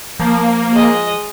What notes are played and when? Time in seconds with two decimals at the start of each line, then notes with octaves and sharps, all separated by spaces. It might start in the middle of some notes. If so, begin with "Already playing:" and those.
0.20 F3 A#3
0.72 G#3 D#5